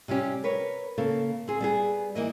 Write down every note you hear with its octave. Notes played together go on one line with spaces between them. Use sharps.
C3 G3 C#4 G4
A#4 B4 C#5
C#3 A#3 A4
C4 G#4
G3 B3 G#4
E3 A#3 D#5